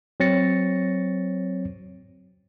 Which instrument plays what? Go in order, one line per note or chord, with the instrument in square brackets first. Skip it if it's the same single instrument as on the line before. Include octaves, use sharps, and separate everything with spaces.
[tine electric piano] F#3 C4 C#5 A6 A#6 C#7